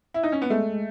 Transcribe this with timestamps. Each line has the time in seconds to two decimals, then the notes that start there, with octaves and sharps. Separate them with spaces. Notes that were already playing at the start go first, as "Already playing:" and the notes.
0.14 E4
0.23 D#4
0.32 C#4
0.42 B3
0.50 G#3 A3